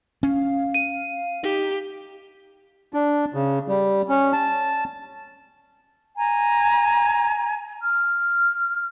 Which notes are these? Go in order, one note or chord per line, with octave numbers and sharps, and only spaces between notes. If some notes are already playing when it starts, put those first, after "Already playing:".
C#4 F5
D#7
D#4 G4
D4
C#3
G3
C#4
A5
G#5 A#5
F6